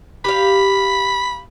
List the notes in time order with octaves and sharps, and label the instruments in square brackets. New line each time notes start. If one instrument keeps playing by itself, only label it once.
[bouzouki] G4 F5 [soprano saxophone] B5